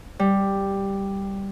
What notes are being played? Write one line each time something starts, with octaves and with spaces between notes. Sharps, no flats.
G3